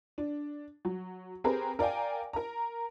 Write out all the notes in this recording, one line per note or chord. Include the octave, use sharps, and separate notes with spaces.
D4
F#3
C4 G4 G#4 A#4 B4
A#4 D5 F5 G5 G#5
A#4 A#5